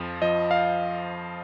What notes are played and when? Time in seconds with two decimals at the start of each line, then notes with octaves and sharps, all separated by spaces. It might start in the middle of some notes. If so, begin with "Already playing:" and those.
Already playing: F2 F3
0.22 F3 D#5
0.51 F5